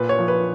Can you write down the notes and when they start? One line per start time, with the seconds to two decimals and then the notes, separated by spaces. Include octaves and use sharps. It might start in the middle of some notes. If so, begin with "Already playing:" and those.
Already playing: A#2 B4
0.09 C#5
0.19 F3
0.28 B4